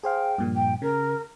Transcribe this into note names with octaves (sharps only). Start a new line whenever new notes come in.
G#4 C5 F5 G5
G2 A#2 F3
G5
C#3 A#4